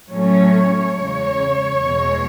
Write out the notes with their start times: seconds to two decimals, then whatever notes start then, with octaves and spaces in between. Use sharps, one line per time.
0.11 A2 F#3 A3 C#4 C#5
0.96 E2 C#3 G#3
1.80 E2 B2 G#3